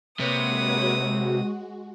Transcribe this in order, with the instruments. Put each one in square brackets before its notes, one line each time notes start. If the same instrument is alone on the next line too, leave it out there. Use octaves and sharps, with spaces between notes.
[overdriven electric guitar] C3 [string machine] G#3 F#4 [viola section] A#3 B4 C#5 [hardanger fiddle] D#6